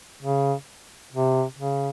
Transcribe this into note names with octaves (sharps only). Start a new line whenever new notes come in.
C#3
C3
C#3